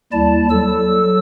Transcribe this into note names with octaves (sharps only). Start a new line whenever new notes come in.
D#2 G3 E4 D5 A5
F#3 A4 E6